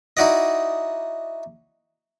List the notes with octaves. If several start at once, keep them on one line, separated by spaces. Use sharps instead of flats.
D#4 E4 F#4 D5 D#5